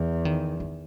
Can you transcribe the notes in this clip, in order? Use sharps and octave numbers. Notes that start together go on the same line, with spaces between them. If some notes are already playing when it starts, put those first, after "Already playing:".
Already playing: E2 E3
D#3
D#3